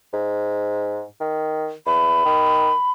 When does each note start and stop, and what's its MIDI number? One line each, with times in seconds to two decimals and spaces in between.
0.13 1.04 44
1.21 1.72 51
1.86 2.23 40
1.86 2.91 83
2.25 2.70 51